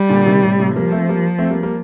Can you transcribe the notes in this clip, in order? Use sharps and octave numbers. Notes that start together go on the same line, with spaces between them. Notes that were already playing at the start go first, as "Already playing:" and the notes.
Already playing: G3
A#2 D3
C3 D#3
A2 C3
A2 C3
F3 G3 A#3
A3 C4
G3 A#3
A3 C4
G3 A#3
G3 A#3